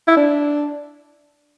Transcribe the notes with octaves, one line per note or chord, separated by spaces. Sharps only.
E4
D4